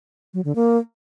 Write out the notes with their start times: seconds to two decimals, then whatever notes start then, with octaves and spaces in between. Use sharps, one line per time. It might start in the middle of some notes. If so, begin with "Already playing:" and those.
0.34 F#3
0.45 D3
0.55 A#3